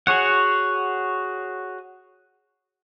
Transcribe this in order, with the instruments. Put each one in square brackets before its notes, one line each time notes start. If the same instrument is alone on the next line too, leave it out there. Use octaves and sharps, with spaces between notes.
[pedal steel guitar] F#4 G#4 C#5 F#5